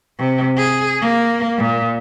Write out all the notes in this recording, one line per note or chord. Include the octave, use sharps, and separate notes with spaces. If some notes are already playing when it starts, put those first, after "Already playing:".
C3
G#4
A#3
A#2